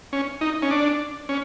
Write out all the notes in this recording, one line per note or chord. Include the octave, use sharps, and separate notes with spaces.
C#4
D#4
C#4
D4
C#4